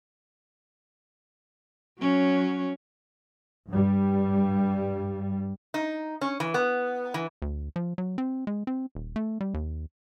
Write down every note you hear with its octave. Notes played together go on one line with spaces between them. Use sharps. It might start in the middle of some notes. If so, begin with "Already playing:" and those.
F#3 C#4
G2 G3
D#4
C#4
E3
B3
E3
D2
F3
F#3
C4
G#3
C4
D#1
A3
G3
D#2